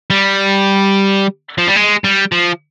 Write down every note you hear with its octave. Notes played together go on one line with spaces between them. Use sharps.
G3
F3
G3
G#3
G3
F3